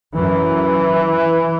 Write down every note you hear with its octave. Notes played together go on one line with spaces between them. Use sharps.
F#2 E3